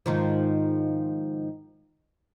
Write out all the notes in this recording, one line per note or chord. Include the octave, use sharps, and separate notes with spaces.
G#2 D#3 F3